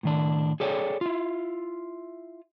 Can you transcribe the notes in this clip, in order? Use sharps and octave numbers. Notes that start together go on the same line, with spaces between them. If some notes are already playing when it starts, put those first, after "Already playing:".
A2 D#3 D4
G#4 A4 C#5 D5 G5
E4 F4